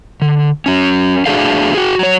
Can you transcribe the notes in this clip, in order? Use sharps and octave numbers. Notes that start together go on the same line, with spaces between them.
D3
F#3 C#4
A3 D4 F#4 G#4 A4 F5
F#4 G#4
F#3 C#5